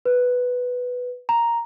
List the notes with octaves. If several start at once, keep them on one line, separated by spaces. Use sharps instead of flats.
B4
A#5